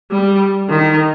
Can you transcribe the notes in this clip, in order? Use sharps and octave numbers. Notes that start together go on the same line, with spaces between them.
G3
D#3